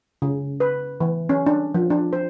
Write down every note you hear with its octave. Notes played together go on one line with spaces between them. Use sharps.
C#3
B4
E3
C#4
D4
F3
D4
C5